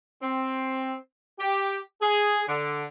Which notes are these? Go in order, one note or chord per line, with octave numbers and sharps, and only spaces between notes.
C4
G4
G#4
D3